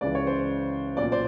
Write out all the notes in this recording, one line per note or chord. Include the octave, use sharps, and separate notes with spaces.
C#2 C#3 E3 D5
C#5
C5 D5
B1 A#2 D5
C5 D5